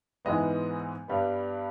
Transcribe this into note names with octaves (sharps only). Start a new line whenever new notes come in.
G#2 E3 G#3 B3 D#5
G2 G3 B3